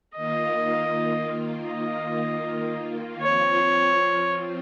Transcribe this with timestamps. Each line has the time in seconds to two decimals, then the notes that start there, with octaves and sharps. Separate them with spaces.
0.16 D#3 A#3 F4 D#5
1.69 D#5
3.21 F3 C4 F4 C#5